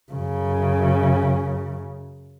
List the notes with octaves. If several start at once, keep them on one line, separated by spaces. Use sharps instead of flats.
F#2 C#3